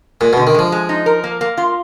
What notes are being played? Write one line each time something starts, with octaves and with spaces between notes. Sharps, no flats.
A#2 G#3
B2
D3
D#3
F3 G#3
G#3
D#4
A#4
A#3
A#3
F4